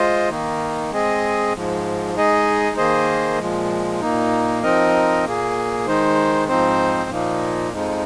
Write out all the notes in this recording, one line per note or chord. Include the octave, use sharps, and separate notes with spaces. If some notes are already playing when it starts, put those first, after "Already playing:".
Already playing: G#3 F4 C5 D#5
D#3 A#3 D#4
G#3 C4 G#4 D#5
G#2 F3 G#3
G#3 D#4 G#4 D#5
D#3 A#3 G#4 C5 D#5
A#2 F3 G#3
A#2 A#3 D#4
F3 C4 D#4 A#4 D#5
A#2 A#3 G#4
D#3 G#3 D#4 C5
G#2 F3 C4 D#4 C5
A#2 F3 A#3 D#4
F2 F3 G#3 D#4